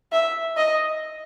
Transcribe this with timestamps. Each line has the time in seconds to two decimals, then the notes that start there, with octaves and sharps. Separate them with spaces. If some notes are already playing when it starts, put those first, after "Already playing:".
0.12 E5
0.57 D#5